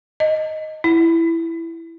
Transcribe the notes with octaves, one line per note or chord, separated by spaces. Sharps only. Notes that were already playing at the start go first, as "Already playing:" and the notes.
D#5
E4